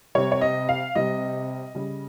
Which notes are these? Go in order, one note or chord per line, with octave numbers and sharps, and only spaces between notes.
C3 G3 C#5
C#5
D#5
F5
C3 G3 D#5
C#3 G3